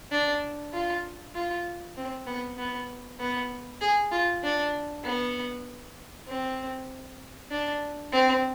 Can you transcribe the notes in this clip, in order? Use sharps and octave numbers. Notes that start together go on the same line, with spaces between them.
D4
F4
F4
C4
B3
B3
B3
G#4
F4
D4
B3
C4
D4
C4